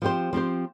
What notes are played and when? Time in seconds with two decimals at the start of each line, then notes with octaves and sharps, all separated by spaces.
0.02 F3 C4 G4 C5
0.33 F3 C4 G4 C5